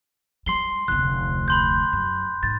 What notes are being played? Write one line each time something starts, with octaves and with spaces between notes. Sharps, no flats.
G3 C6 C7 G7
F1 D2 F#6
B5 C6 G6
F#2
G#2 A6